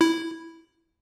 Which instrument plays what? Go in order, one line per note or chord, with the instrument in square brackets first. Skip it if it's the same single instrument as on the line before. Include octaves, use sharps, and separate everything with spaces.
[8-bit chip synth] E4